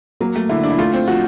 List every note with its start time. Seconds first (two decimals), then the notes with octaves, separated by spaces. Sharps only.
0.21 F#3 A#3
0.36 A3
0.49 D3 E4
0.63 D4
0.70 E4
0.78 A3 F4
0.93 C4
1.08 F3 F#4